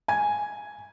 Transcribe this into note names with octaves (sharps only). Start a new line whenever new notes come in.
G#5 G#6